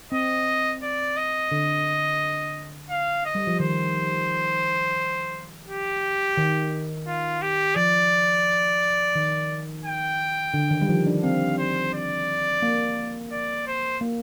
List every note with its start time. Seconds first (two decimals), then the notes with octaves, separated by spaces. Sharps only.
0.12 C4 D#5
0.82 D5
1.17 D#5
1.52 D3
2.90 F5
3.25 D#5
3.35 G3
3.47 F3
3.60 D#3 C5
5.67 G4
6.37 D#3
7.07 F4
7.42 G4
7.76 F3 D5
9.15 D#3
9.85 G5
10.54 D3
10.71 D#3
10.81 G3
10.89 F3
11.07 D4
11.23 C4 F5
11.58 C5
11.93 D5
12.62 A#3
13.32 D5
13.67 C5
14.01 A#3